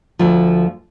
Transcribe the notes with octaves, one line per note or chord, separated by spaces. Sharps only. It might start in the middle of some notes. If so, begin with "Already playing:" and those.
D2 F3